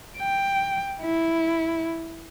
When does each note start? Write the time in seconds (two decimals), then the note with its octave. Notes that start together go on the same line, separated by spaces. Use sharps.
0.17 G5
1.01 E4